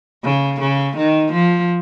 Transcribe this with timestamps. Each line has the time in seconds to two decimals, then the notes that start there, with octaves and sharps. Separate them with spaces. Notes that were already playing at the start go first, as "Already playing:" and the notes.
0.24 C#3
0.60 C#3
0.96 D#3
1.32 F3